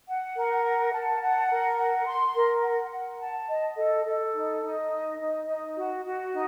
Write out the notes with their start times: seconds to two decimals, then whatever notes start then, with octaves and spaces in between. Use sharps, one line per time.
0.07 F#5
0.35 A#4
0.64 F#5
0.92 A5
1.20 F#5
1.49 A#4
1.77 F#5
2.05 C6
2.34 A#4
2.63 F#5
2.91 F#5
3.20 A5
3.48 D#5
3.76 A4
4.05 A4
4.33 D#4
4.61 D#4
4.89 D#5
5.19 D#4
5.46 D#4
5.76 F#4
6.03 F#4
6.32 D#4